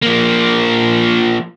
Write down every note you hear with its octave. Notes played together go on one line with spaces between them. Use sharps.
F3 A#3